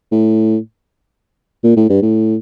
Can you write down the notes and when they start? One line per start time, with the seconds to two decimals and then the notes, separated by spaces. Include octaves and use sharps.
0.11 A2
1.63 A#2
1.76 A2
1.89 G2
2.02 A2